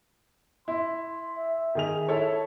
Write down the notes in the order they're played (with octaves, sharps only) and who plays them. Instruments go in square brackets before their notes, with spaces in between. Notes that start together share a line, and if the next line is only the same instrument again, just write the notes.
[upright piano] E4 [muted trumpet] C6
[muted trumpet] E5
[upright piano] D#3 G#4 F7
[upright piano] E4 A4 C#5 [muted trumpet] A5